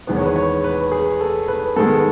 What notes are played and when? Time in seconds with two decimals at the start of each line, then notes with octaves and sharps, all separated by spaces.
0.07 E2 D#3 G#3 B3 B4
0.17 C#5
0.25 B4
0.36 C#5
0.64 B4
0.92 G#4
1.21 A4
1.48 B4
1.76 G#2 D#3 G#3 B3 A4